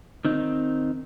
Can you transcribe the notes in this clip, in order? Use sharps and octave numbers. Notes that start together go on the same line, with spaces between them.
D#3 C4 D#4